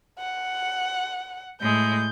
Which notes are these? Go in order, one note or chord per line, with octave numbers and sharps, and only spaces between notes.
F#5
A2 G#3 G6